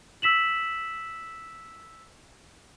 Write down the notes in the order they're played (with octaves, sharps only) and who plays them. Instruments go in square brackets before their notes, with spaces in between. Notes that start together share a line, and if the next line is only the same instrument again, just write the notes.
[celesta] E6 B6 E7 F#7